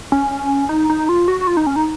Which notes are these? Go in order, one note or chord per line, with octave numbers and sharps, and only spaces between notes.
C#4
D#4
D#4
F4
F#4
F#4
F4
D#4
C#4
D#4